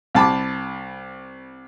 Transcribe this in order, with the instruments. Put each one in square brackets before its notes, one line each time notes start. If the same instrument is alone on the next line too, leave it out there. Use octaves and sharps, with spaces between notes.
[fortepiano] C2 A5 B5 D6